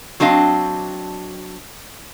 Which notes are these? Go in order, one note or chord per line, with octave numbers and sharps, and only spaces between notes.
F#3 C4 D4 D#5 F5